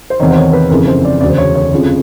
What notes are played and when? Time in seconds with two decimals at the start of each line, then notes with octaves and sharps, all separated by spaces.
0.10 C5
0.20 E2 C3 D#3 C#5
0.31 C5
0.36 C#5
0.53 B4
0.70 F#1 F2 C#3 E3 A#4
0.88 C5
1.05 D5
1.21 E1 D2 C#3 D5
1.30 C5
1.38 C#5
1.55 C#5
1.71 G1 F2 C#3 F3